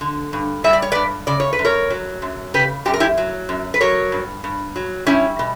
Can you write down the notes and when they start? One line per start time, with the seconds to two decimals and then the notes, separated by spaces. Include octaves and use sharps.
0.01 D3
0.33 G2
0.64 G3 E5
0.73 D5
0.82 C#5
0.92 G2 B4 D5
1.27 C#3 D5
1.40 C#5
1.53 B4
1.59 F#2
1.65 A#4 C#5
1.90 F#3
2.22 F#2
2.54 C#3 G4 B4
2.86 F#2 G4
2.94 A#4
3.00 E4 G4
3.18 F#3
3.49 F#2
3.74 B4
3.81 F#3 A#4 C#5
4.12 G2
4.44 G2
4.76 F#3
5.07 G3 C#4 E4
5.39 B2